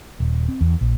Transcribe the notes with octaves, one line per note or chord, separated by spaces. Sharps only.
D#1
C4
E2
A#1